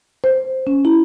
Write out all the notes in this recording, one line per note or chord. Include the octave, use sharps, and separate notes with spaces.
C5
C#4
E4